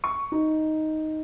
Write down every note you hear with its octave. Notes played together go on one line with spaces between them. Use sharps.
C#6
D#4